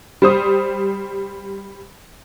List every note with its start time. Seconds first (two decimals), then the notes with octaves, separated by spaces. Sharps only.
0.22 G3 C5 D#6